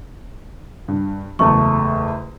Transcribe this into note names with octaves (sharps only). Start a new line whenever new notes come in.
G2
F#1 E2 A3 C#6